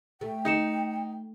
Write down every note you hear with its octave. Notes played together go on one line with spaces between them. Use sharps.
A3 G5
D#4 G6 C#7 E7